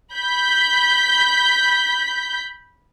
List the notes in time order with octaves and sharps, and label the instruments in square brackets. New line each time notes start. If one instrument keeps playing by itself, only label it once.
[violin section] B5 G6 B6